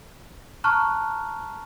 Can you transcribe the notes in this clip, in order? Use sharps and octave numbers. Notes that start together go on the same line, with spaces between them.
A5 A#5 C#6 F6 F#6